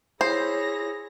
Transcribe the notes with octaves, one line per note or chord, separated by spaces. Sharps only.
E4 G#4 C5 C#5 A#6